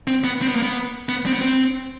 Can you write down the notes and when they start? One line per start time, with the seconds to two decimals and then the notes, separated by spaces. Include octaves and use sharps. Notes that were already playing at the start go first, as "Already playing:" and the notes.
0.07 C4
0.24 B3
0.42 C4
0.48 B3
0.56 A#3
0.63 B3
1.09 B3
1.26 C4
1.33 B3
1.41 C4